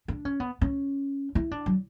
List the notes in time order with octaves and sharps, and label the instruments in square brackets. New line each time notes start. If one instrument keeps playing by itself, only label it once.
[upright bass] D4
C#4
B3
C#4
E4
D4
F#3